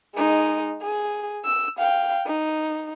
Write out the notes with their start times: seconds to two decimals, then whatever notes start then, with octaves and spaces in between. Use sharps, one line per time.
0.15 G#3 D#4
0.82 G#4
1.45 E6
1.78 F5 G5
2.26 D#4